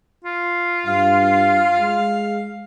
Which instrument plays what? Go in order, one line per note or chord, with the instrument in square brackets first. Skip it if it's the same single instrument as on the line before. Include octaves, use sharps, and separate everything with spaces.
[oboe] F4
[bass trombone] G2 [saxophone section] F5
[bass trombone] G#3